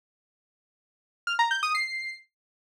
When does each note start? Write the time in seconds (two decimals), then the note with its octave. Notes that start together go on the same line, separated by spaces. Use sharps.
1.27 F6
1.39 A#5
1.51 G6
1.63 D#6
1.75 C7